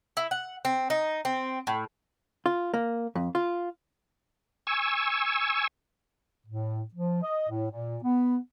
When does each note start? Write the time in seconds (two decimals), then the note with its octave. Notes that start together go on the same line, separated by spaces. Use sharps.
0.17 E4
0.31 F#5
0.65 C4
0.90 D#4
1.25 C4
1.67 A2
2.46 F4
2.74 A#3
3.15 F2
3.35 F4
4.67 G#5 C#6 E6
6.47 A2
6.94 F3
7.22 D#5
7.48 A2
7.71 A#2
8.03 B3